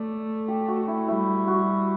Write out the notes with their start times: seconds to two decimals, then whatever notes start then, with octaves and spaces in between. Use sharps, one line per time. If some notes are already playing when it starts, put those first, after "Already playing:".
Already playing: A3 D5
0.48 G4
0.68 F#4
0.88 E4
1.08 G3 E4
1.47 F#4